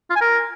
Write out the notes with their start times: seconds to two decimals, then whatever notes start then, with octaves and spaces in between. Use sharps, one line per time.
0.10 F4
0.15 G#5
0.21 A#4